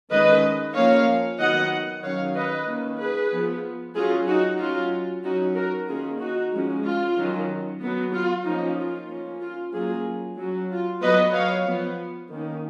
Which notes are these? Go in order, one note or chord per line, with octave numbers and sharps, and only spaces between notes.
D#3 G#3 C#4 B4 D#5
F3 A#3 C#4 C#5 F5
D#3 F#3 B3 D#5 F#5
D#3 F#3 C#4 C#5 F5
B4 D#5
D#3 A#3 C#4
G#4 B4
F3 B3
F#3 C#4 F4 G#4
D#4 F#4
F#3 C#4 F4
F#3 C#4 D#4 F#4
F#4 A#4
D#3 A#3 C#4 F4 G#4
D#4 F#4
F3 G#3 C#4
F4
D#3 F#3 C#4
F#3 B3
F4
F3 A#3 C#4 D#4
F4
F3 A#3 C#4
F4
F#3 A#3 C#4 F4 G#4
F#3 C#4
F4
F#3 B3 B4 D#5
C#5 F5
F3 B3
D#3 A#3 C#4